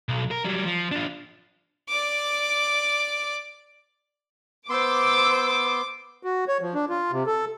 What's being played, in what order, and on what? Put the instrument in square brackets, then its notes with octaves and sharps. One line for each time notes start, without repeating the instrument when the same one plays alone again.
[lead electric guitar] B1
A#4
F#3 G3
F3
D4 F4
[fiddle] D5 D6
[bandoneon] B3 C6 [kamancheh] C5 E6 [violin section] D6
[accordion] F#4
C#5
F3
D4
F4
C3
A4